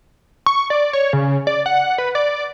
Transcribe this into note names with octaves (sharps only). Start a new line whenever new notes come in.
C#6
D5
C#5
C#3
D5
F#5
B4
D5